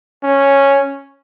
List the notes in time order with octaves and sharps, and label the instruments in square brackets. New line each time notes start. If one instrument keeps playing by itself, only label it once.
[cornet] C#4